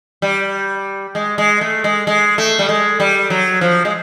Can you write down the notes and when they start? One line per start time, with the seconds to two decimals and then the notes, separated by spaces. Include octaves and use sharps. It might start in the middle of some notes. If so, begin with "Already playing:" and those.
0.22 G3
1.15 G#3
1.38 G#3
1.61 A3
1.84 G#3
2.07 G#3
2.38 A3
2.59 G3
2.69 G#3
3.00 G3
3.30 F#3
3.61 F3
3.85 G#3